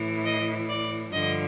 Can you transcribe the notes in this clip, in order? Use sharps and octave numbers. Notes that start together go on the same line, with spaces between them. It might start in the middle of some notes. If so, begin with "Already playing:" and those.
Already playing: A2 E3
D#5
D5
G2 D3 F3 D#5